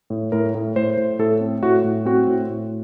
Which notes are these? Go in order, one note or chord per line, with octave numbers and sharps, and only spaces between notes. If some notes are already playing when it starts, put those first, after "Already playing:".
A2
A2 A#4
A2
A2 C5
A2
A2 A4
C4
A2 F#4
A2
C4 F#4
A2
A2